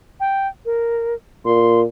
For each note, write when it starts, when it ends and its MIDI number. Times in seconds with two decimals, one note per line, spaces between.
0.20 0.48 79
0.66 1.14 70
1.45 1.83 46
1.45 1.80 84